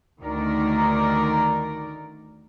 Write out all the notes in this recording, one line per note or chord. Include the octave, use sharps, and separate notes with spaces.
D2 D#3 A#4 D5